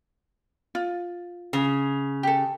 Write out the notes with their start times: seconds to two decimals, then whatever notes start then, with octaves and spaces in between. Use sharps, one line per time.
0.75 F4
1.53 C#3
2.23 G4 A4